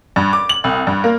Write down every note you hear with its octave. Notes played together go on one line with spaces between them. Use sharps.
G2
D6
F#7
C2
G2
A#3